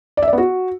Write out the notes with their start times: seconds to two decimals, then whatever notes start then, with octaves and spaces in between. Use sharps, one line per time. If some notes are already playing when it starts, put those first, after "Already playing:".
0.17 D5
0.23 E5
0.28 D5
0.33 B3
0.38 F#4